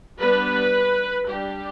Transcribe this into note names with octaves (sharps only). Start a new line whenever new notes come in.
G3 B3 D4 B4
G3 D4 G4